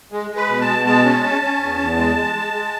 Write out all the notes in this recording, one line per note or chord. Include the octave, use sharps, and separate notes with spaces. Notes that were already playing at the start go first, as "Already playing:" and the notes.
G#3
G#3
B4
B2
A5
B2
G#3 A5
C#4
C#4
C#4
E2
E2
G#3
G#3
G#3
G#3